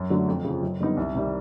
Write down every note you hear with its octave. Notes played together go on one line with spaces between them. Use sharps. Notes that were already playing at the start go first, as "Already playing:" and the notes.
Already playing: F#2
D3 F#3 A3
F2
C#3 F3
F#2
D3 G3 B3 D#4
C2
C3 D#3 G3